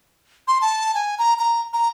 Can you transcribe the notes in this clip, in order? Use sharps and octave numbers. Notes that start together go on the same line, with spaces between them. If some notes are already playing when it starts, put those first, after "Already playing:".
C6
A5
G#5
A#5
A#5
A#5